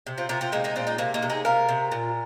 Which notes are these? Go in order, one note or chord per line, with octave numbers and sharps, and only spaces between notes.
C3
C4 F4
C3 F4 A#4
C4 F4
G#3 A#3 D#4
A#3 D#4
A#2 C4 F4
A#3 D#4
C3 A#3
A#3 D#4
C3
D#4 G#4
C3 F4 A#4
C3
A#2